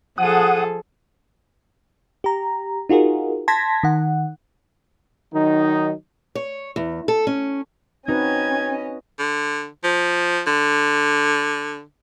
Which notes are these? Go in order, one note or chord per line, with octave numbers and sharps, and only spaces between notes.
F3 G#4 A4 F#5 D#6
G4 A#5
D#4 F4 F#4 G#4 A#4
A5 C6 G#6 A#6 B6
D#3 F#5
D#3 F#3 D#4
C#5
E2
A4
C#4
C4 C#4 D#4 F#4 B4 D#5 G#6
D3
F3
D3